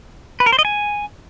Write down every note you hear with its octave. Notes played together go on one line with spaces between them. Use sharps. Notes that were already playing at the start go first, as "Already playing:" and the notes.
B4
A#4
C5
D#5
G#5